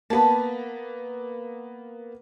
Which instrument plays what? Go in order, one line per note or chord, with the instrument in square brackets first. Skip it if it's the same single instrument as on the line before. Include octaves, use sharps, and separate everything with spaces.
[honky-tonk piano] A#3 B3 [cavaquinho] A5 B5